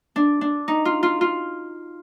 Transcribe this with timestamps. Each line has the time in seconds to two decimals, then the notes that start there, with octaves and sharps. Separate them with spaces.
0.16 D4
0.41 D4
0.68 D#4
0.85 F4
1.03 F4
1.21 F4